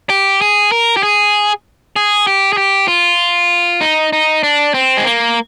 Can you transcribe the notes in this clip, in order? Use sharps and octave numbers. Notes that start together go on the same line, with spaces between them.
G4
G#4
A#4
G4
G#4
G#4
G4
G#4
G4
F4
D#4
D#4
D4
C4
G#3
A#3